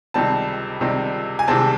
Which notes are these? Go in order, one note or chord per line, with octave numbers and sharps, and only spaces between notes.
C#2 C3 D#3 G3 C4 A5
C#2 C3 D#3 G3 C4
G#5
C2 C3 D#3 G#3 C4 A5